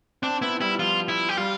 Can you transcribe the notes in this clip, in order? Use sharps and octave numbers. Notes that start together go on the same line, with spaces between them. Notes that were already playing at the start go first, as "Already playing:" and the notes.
C4 D4
B3 E4
G3 E4
F3 F4
E4
G4
G3 F4